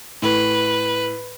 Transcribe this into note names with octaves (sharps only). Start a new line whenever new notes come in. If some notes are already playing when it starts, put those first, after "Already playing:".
A2 B4